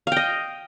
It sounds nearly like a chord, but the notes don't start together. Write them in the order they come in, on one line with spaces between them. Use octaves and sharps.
F5 G5 D#5